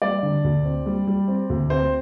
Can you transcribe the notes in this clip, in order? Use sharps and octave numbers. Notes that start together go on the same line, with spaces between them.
G3 D5
D3
D2
C4
G3
G3
C4
D2
C4 C5